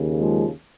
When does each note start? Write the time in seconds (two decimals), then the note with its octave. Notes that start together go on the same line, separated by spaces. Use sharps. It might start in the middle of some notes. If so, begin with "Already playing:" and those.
Already playing: D#2 C#3
0.18 F3 G#3